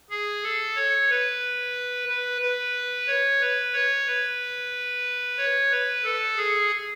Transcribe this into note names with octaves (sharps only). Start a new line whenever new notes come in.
G#4
A4
C#5
B4
B4
B4
C#5
B4
C#5
B4
C#5
B4
A4
G#4